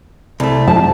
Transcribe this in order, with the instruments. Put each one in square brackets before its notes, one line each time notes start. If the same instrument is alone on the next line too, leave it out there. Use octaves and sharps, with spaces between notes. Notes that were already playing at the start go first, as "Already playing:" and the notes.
[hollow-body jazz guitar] C2 A3
[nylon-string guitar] A5